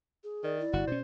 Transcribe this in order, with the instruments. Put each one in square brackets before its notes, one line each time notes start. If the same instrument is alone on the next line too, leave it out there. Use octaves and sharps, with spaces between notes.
[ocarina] G#4
[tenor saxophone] D#3 [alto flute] D5
[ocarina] E4
[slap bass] G1 [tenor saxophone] F#4
[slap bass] B2 C#4 [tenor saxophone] C5